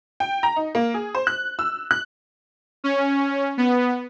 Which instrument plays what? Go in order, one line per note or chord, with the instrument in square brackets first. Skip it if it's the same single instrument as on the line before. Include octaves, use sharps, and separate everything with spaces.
[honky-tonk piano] G5
A#5
D#4
A#3
G#4
C5
F#6
E6
F#6
[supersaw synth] C#4
B3